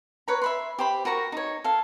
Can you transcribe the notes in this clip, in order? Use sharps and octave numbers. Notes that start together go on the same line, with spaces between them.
B4 C#5 A#5
E5 B5 C6
G4 C5 B5
F#4 A#4 A#5 C#6
D#4 C#5
A4 F5